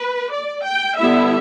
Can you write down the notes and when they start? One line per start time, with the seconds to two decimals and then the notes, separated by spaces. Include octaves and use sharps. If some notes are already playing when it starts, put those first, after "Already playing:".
Already playing: B4
0.32 D5
0.65 G5
0.97 D3 G3 B3 E4 E5